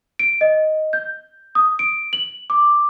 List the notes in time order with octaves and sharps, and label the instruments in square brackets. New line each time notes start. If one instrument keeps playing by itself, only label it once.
[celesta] D7
D#5
G6
D#6
D7
F#7
D6